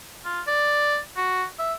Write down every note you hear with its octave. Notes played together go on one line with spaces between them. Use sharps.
F4
D5
F#4
E5